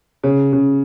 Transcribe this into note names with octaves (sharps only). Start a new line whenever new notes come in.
C#3
C#3